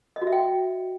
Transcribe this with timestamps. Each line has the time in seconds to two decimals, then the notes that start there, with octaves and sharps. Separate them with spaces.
0.16 D#5
0.22 F#4
0.27 E5
0.32 G5